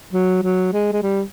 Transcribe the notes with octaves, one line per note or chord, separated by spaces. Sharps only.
F#3
F#3
G#3
G#3
G3